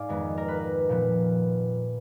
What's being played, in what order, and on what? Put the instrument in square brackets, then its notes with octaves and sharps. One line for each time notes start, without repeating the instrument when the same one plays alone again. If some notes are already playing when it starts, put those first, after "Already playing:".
Already playing: [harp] G#2 D5 F5 G#5
F2 D#3 G#3 B3
A#4
B4
A#2 F3 B3